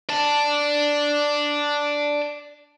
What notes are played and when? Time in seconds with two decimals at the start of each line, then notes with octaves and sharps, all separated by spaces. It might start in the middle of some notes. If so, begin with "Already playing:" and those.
0.10 D5 A5